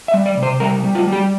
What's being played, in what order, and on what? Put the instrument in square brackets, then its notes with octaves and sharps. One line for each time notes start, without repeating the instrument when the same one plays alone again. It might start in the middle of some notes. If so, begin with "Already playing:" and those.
[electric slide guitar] E5
G3
D5
C3
C5
G3 A#4
G3
F4
G3
G4